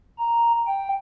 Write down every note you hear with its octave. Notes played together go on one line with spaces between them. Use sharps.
A#5
G5